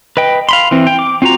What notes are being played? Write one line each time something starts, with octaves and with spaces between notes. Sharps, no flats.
B4 D#5 G5
F5 B5 C6
E3 C4
G5
D6
C4 F4 F#4 A#5